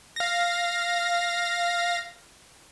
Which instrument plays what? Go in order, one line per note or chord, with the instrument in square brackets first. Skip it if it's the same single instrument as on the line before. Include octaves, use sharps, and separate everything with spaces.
[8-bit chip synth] F5 A#6